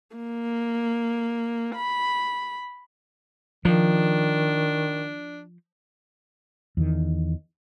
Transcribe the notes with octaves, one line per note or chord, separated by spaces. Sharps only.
A#3
B5
D#3 F3 D4
E2 D#3